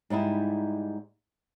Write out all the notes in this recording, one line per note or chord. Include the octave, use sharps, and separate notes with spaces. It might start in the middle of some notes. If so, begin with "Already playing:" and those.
G#2 G3 D#4 E4